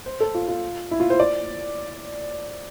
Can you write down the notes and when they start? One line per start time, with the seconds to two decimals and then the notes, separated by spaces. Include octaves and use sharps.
0.06 C5
0.20 A4
0.35 F4
0.48 F4
0.91 E4
1.00 F4
1.10 C5
1.20 D5